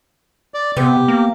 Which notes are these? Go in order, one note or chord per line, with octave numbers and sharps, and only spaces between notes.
D5
C3 B3 G4
A#3